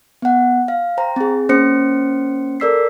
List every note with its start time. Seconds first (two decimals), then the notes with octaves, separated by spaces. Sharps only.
0.22 B3 F#5
0.68 F5
0.98 C5 G5 A#5
1.16 C4 G#4
1.49 A#3 C#4 C5 C#7
2.60 A4 A#4 D5 E6 B6 C7